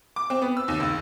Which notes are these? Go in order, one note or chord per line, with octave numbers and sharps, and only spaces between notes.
D6
C4
B3
E6
D#2
C#2